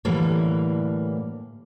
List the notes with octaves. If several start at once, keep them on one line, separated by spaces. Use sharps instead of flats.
A2 D3 E3 G3 A#3